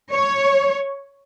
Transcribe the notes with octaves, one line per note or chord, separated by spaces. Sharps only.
C#5